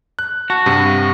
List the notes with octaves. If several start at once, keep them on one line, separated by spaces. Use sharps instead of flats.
F#6
F#4 A5
G2 C3